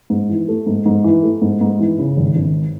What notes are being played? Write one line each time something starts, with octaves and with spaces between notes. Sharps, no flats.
G#2
E3
A3
G#2
G#2
E3
A3
G#2
G#2
E3
C#3
G#1
G#1